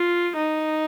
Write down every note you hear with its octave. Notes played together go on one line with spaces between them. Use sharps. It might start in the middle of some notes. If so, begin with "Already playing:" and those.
Already playing: F4
D#4